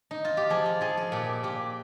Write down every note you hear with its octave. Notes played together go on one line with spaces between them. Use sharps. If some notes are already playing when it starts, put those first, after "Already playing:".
D#4
F4
G4
F3 G#4
F4
F3 G#4
G#4
A#2 G4
A#2 G4